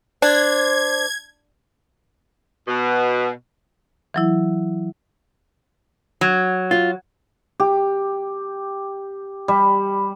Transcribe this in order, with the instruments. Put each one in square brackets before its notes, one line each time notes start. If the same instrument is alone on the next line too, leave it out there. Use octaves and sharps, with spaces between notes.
[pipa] D4 [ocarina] C5 [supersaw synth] G#6
[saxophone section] B2
[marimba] E3 F#3 E4
[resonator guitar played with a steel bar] F#3
[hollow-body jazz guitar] F4
[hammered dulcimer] G4
G3